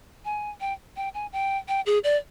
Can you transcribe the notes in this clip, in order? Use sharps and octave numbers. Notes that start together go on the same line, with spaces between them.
G#5
G5
G5
G#5
G5
G5
G#4
D5